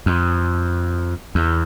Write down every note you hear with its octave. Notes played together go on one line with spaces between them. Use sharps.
F2
E2